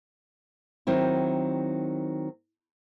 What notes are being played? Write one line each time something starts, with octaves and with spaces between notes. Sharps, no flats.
D#3 F#3 C4 E4